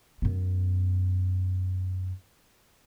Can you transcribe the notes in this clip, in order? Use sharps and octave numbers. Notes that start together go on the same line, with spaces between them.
F#2 B3